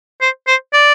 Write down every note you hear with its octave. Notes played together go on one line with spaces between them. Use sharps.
C5
C5
D5